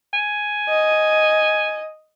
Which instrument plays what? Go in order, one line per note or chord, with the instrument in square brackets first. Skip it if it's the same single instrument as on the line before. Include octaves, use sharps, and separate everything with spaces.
[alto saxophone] G#5
[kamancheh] D#5